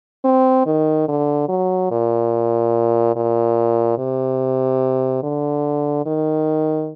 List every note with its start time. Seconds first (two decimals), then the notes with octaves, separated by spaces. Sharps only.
0.25 C4
0.66 D#3
1.08 D3
1.49 F#3
1.91 A#2
3.16 A#2
3.98 C3
5.23 D3
6.06 D#3